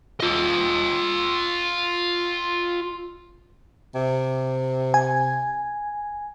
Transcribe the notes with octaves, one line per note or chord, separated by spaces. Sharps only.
F4 D#5
C3
G#5